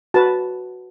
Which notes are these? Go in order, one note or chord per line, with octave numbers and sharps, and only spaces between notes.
F#4 B4 A5